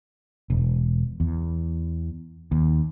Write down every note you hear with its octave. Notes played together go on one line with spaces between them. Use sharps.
E1
E2
D#2